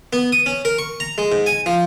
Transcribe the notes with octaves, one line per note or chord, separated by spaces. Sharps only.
B3
D#6
C#4
A#4
C#6
A#5
G#3
G#2
G#5
F3